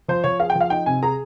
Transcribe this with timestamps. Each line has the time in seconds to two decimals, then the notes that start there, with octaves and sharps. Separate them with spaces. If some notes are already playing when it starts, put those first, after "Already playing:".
0.08 F3 C5
0.24 F3 C#5
0.40 G#4 F5
0.50 G5
0.55 F3
0.61 F5
0.70 D#4 G5
0.86 C3 G#5
1.03 G#4 A#5